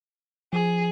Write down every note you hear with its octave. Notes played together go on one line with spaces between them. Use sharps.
F3 G#4